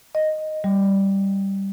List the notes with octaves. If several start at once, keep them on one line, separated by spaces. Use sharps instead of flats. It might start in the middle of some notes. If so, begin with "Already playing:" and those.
D#5
G3